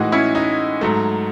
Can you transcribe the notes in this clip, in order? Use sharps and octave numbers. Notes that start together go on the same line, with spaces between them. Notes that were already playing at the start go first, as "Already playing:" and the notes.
Already playing: A2 E3 G#3 D#4 F#4
C#4 E4
D#4
G#2 F#3 A3